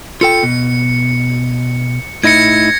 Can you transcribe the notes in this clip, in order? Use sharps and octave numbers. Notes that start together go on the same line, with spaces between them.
F4 A4 G5 C#7
B2
A2 D#4 E4 G#6 A#6 C#7